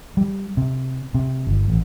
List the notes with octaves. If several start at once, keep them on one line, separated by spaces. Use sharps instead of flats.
G3
C3
C3
G1
A1